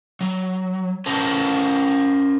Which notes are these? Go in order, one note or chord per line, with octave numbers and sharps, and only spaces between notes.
F#3
C#4 A#4 C5 A5